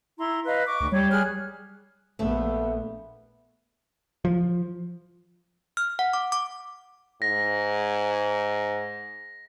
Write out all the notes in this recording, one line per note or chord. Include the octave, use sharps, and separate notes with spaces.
E4 A#5 C6
B4 D#5 F5
C#6 D6
D2
G3 C#5
G#4 F6 F#6
A#1 A3 B3 A4 E5
F3
F6
F#5
D6
D6
G#2 A#6